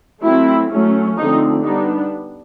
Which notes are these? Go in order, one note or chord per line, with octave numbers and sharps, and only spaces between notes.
F#3 A3 C4 E4
F#3 A3 C#4
D3 F3 A3 C4 D#4
G3 B3 D4 D#4